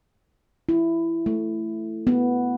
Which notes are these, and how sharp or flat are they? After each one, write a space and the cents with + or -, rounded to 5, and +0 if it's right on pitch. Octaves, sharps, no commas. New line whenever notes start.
E4 +10
A3 +0
B3 -5